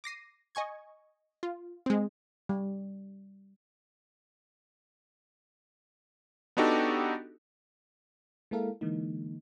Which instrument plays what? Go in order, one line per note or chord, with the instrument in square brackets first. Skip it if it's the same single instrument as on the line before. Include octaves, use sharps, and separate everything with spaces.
[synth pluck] D6 A#6 C7 D#7
D#5 G#5 C#6 G#6
F4
G#3 C4
[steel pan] G3
[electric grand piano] B3 D4 D#4 F#4 G4 A4
[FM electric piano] G#3 A#3 E4 A4 A#4 F5
D3 E3 G#3 A#3 D#4